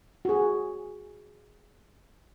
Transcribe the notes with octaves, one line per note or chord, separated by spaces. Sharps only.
F#4 G#4